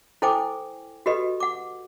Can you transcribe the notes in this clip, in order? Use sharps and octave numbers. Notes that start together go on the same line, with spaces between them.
E4 A4 C5 G5 G#5 D6
F#4 G4 A4 B4 D#5
F#5 D6